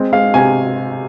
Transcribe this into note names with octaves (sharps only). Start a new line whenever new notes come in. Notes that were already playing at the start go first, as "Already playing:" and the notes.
Already playing: G#3 C4
G#3 F5
C3 G#5